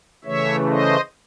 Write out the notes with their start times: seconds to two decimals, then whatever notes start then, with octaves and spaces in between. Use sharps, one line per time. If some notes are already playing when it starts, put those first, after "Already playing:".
0.24 C#3 E3 A3 C#5 E5
0.69 C5 D#5